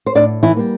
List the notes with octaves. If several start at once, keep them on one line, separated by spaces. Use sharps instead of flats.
C5
A2 D4 D5
E3 E4
G3 A#3